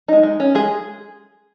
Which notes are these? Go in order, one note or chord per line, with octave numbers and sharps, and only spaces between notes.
G#3 D#4
G#3
C#4
G#3 G#4